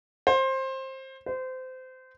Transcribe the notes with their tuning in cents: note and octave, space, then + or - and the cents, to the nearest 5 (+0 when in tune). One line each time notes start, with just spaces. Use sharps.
C5 +20
C5 -25